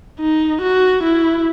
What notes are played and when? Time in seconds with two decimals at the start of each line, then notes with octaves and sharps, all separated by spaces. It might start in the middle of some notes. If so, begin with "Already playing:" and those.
0.20 D#4
0.62 F#4
1.03 E4